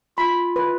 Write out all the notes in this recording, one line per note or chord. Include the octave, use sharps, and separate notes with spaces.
F4 B5
B4